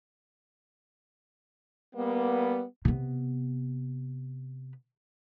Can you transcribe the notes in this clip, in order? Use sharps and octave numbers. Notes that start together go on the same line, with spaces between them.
G3 A#3 B3
C3 B3